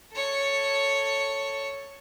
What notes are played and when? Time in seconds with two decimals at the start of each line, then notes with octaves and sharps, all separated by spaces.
0.12 A4 C#5